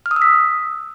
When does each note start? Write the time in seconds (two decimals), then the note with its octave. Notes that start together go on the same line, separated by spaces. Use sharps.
0.06 F6
0.11 D#6
0.16 E6
0.22 B6